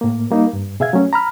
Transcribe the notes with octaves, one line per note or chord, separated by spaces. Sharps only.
A2 A#3
G3 A#3 D#4
G2
B2 G#4 E5 F5 G#6
F#3 A3 C#4
A#5 B5 F6